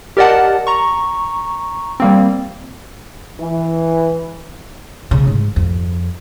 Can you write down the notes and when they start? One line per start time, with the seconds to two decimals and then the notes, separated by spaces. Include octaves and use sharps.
0.17 G4 A#4 D5 D#5 F#5 A5
0.67 A#5 C#6
2.00 G3 A#3 C4
3.40 E3
5.11 C#3
5.27 G#2
5.56 F2